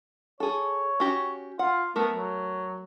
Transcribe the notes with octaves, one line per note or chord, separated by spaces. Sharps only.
G#4 A4 C#5
C#4 F#4 G4
F4 F#5
A3 B3 A#4
F#3